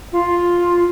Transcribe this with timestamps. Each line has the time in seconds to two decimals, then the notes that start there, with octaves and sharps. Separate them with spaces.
0.12 F4